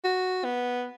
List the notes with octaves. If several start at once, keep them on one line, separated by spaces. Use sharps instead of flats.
F#4
B3